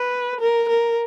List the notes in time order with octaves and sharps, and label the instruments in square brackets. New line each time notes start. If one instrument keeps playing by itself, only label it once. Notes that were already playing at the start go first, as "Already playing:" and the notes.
Already playing: [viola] B4
A#4
A#4